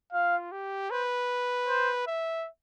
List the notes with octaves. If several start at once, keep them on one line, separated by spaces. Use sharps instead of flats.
F4 F5
G4
B4 C5
C5
E5